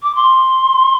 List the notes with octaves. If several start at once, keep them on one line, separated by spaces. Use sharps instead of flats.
D6
C6